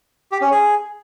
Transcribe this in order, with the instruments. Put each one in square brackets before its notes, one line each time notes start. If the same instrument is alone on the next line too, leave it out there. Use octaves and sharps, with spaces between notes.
[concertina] G4
C#4
G#4